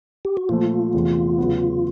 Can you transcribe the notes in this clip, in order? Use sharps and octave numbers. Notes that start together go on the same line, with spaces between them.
G4
F#4
A#2 F3 A3 F4
E2 C3 E3 A3
E2 C#3 F#3 B3